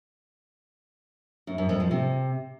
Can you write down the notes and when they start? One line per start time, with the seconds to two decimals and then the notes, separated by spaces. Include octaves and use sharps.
1.47 F#2
1.58 F#2
1.69 F2
1.80 F3
1.91 C3